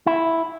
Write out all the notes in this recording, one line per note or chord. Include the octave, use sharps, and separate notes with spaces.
E4